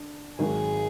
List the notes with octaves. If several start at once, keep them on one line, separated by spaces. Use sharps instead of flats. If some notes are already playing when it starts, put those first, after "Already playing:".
Already playing: D3 D4
G#1 G#2 D#3 F#3 G#4